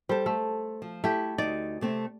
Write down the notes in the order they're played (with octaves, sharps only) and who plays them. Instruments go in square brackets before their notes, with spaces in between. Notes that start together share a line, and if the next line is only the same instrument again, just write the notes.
[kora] G3 [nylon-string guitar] A4 C5
[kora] A3
[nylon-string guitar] F3
[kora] A3 G4 [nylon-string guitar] E4
[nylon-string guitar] D2 D#4 [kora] D5
[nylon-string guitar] C3 A3 C4